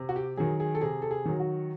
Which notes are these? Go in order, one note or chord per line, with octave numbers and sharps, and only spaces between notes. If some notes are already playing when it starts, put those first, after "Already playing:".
Already playing: C3
F#4
G4
D#3 F#3 G#4
G#4
A4
C3 G#4
A4
G#4
D#3 F#3
F#4